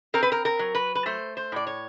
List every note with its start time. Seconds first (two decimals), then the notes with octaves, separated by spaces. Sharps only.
0.14 C4 A#4
0.23 B4
0.32 A#4
0.45 A#4
0.59 F#3
0.75 B4
0.95 B4
1.06 A3 C5
1.37 C5
1.52 A2 D5
1.67 C#5